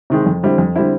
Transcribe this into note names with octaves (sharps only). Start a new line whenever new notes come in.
C3 D#3 G#3
F2
D3 G3 C4 E4
F2
D3 G3 C4 E4